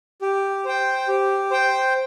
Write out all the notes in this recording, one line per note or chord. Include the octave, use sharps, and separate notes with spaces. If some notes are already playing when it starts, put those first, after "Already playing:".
G4
C5 G5
G4
C5 G5